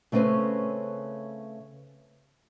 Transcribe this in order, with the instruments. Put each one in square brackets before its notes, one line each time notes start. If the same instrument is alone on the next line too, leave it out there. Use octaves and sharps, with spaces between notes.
[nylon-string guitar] C#3 A3 C4 C#4 B4 C5